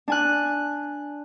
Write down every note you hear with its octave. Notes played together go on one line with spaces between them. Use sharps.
D4 G#5 F#6